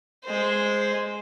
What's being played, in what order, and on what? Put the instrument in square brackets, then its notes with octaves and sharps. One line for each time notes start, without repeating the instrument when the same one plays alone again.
[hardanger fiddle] G#3 C5